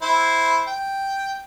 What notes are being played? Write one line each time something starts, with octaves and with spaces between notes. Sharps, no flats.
E4 C5
G5